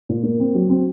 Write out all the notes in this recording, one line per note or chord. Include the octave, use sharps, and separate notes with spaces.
A#2
A#3
C4
F#3
C4